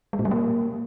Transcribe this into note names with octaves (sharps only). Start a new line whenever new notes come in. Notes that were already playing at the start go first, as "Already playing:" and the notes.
G#3
A#2
G3
A#3